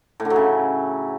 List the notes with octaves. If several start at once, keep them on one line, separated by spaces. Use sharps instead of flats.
A2
D3
F#3
C#3